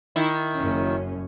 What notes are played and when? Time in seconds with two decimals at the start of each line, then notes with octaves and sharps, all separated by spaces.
0.16 D#3 E4
0.56 F#1 F#2 C#4